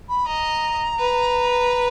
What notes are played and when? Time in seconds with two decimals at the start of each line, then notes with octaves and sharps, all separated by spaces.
0.09 B5
0.26 D#5 A#5
0.99 B4